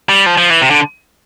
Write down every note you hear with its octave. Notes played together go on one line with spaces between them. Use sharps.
G3
F3
F3
E3
C3
D3